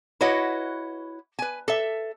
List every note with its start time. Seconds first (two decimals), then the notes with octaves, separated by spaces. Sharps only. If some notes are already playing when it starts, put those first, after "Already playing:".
0.21 E4 F#4 B4 C#5 D#5 F#5
1.39 B4 G#5
1.68 A4 E5